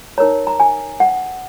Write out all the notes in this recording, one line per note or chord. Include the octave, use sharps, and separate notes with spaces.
D#4 A#4 C#5 A#5
A#5
G#5
F#5